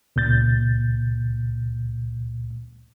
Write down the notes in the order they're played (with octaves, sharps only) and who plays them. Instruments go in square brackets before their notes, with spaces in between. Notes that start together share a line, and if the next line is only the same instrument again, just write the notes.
[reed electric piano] C#2 A#2 G6 A6